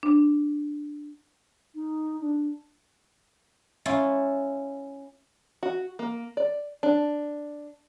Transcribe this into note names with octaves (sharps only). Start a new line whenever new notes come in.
D4
D#4
D4
C#4 E4 F4
F#4
A#3
D5
D4